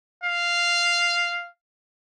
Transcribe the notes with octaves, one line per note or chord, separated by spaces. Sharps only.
F5